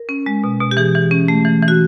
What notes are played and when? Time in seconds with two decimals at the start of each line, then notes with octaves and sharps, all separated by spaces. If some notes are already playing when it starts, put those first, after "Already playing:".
Already playing: A#4
0.09 C#4
0.26 G#3
0.44 B2
0.60 B2
0.71 G4
0.77 E3 G#4
0.95 E3
1.11 C#4
1.28 A3
1.45 E3
1.62 E3
1.68 F#4